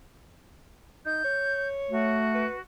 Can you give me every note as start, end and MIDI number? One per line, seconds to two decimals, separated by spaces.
1.06 1.22 63
1.06 1.67 91
1.24 2.21 73
1.91 2.46 57
1.91 2.60 66
2.35 2.57 71